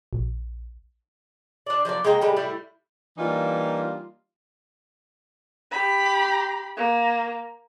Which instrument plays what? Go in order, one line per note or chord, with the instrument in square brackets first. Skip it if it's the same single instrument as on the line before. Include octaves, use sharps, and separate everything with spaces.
[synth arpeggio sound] A#1
[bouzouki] D4 D5
F3 F#3 A#3 D5
G#3 A#3 G5 A#5
A2 G3 G#3
A2 G3 E4
[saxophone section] E3 G3 A#3 D4 D#4 F4
[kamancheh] G4 B5
A#3